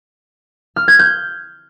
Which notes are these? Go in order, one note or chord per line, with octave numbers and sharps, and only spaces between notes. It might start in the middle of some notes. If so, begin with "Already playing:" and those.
F6
G#6
G6